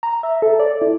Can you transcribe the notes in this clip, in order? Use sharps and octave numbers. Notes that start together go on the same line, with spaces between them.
A#5
E5
A4
D5
E4